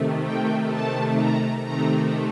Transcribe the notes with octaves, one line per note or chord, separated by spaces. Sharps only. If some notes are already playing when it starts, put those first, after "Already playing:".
Already playing: C3 D#3 A3
G5
A5
A#5
C3 D#3 A3 A#5